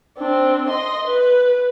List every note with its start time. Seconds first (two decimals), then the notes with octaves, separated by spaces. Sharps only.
0.18 C4 D4
0.70 D#5 C6
1.07 B4